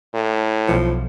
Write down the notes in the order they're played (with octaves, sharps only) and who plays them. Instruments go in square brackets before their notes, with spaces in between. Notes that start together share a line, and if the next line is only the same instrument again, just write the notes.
[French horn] A2
[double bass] B1 [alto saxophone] F3